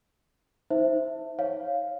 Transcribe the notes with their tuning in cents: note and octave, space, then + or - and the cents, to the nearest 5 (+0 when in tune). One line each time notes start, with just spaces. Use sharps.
D#4 +30 C5 +0 E5 +0
C#5 +0 F5 +0